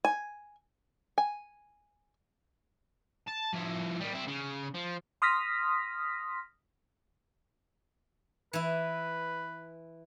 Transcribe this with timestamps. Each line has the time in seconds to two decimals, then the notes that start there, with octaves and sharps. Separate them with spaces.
0.05 G#5
1.18 G#5
3.27 A5
3.53 F3 E4
4.00 D#3 G3
4.13 C4 E4
4.27 C#3
4.74 F3
5.22 C6 D#6 F6 A#6 B6
8.53 E3 E4 B4